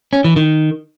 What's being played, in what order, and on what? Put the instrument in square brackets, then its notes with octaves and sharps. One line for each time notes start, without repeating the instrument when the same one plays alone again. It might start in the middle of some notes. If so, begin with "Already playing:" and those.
[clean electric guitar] C#4
E3
D#3